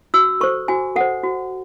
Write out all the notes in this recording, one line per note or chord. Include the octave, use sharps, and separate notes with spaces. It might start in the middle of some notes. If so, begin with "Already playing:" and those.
F#4 E6
A4 C5 C#6
F#4 G#5
A4 C5 F#5
F#4